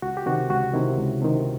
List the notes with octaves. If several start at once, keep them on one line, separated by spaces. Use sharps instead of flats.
C#2 F#4
G4
C3 D#3 F#4
C#2 F#4
C3 D#3 E4
C#2
C3 D#3